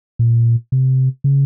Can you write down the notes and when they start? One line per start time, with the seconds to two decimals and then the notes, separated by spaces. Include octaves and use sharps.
0.19 A#2
0.72 C3
1.24 C#3